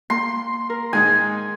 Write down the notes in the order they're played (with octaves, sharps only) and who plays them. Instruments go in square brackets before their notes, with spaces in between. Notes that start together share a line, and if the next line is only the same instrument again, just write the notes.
[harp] A#3 [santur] C6
[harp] A#4
[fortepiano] G#2 G#3 D#4 [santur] G#5